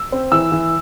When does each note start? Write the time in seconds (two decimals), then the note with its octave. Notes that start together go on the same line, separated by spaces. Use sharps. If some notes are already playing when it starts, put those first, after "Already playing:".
Already playing: E6
0.12 C4
0.32 E3 E6
0.52 E3